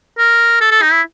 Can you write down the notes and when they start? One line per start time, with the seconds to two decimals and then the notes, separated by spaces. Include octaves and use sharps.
0.18 A#4
0.61 A4
0.71 A4
0.82 D#4
0.92 E4